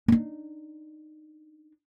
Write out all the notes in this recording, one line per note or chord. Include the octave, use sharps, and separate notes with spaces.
D4 D#4